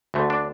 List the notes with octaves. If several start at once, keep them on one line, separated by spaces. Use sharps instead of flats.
D2 D3 A3
D4